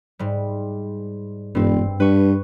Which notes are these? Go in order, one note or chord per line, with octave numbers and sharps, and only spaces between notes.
G#2 G3
E1 G2 C4
G2 B4 C#6